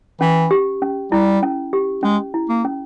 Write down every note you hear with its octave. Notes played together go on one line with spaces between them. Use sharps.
E3 C#4
G4
C#4
G3 E4
C#4
G4
G#3 C#4
E4
A#3
C#4